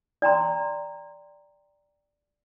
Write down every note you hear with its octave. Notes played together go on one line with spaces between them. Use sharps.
D5 G5 A#5 C6